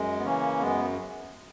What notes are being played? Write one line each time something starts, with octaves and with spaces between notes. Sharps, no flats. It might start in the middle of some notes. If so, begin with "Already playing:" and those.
Already playing: F#2 G#3
B3
C#3 E3 A#3 C#4
F#2 G#3 B3